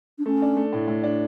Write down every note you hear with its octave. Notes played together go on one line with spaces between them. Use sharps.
D4
A3 C#4
D4
A3
A2
A2
D4